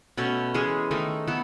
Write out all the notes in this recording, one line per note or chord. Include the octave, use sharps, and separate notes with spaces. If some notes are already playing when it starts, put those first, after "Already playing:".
B2 A3 C#4
E3 G#3 C#4 G#4
D#3 A3 D#4
B3 E4 A4